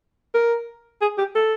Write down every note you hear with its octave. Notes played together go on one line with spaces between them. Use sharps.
A#4
G#4
G4
A4